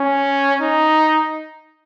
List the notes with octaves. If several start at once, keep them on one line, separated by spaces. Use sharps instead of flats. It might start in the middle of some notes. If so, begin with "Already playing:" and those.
Already playing: C#4
D#4